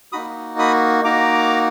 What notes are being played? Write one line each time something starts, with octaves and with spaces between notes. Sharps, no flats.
A#3 D#4 F#4 B5 D#6
B5 D#6
A#3 D#4 F#4 A#5 D6